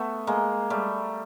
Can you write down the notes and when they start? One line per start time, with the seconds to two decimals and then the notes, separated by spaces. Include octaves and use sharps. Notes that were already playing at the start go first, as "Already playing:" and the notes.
Already playing: A3 B3
0.27 G#3 A#3
0.70 G3 A3